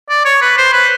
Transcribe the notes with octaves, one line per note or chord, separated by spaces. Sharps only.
D5
C#5
B4
C5
B4